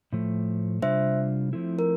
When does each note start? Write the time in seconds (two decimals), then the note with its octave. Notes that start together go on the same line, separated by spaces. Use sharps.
0.12 A2 F3 A3
0.82 C3 G3 D4 F4 C5 E5
1.53 F3 A3 C4 E4
1.79 A#4